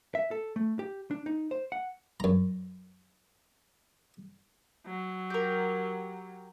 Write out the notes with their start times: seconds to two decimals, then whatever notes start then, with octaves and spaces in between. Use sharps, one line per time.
0.15 E5
0.31 A4
0.56 A3
0.79 G4
1.11 D4
1.26 D#4
1.51 C5
1.72 F#5
2.20 F#2 A#5
4.86 F#3
5.30 G4 A#4